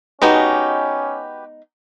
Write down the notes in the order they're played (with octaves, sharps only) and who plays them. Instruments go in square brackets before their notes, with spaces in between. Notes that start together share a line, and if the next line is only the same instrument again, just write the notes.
[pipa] G#3 B3 D#4 [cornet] C#4 [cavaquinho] F#4 G4 B4